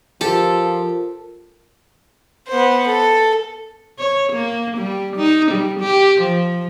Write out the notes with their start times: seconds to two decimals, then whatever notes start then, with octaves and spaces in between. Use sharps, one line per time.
0.21 F3 F4 G4 A4 A#4
2.48 B3 C5
2.87 A4
3.99 C#5
4.33 A#3
4.78 G3
5.17 D#4
5.52 G3
5.80 G4
6.21 F3